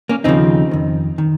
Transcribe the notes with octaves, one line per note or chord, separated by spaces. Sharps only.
A#3 C#4
D#2 C#3 F3 C4 D#4
F2 D#3
D#3